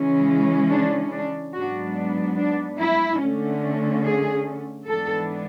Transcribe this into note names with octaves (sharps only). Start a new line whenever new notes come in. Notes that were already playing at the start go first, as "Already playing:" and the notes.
Already playing: C#3 E3 G#3 C#4
D4
D4
G#2 F#3 B3 D4 F#4
D4
E4
D3 A3 C#4
G#4
G#2 E3 B3 D4 A4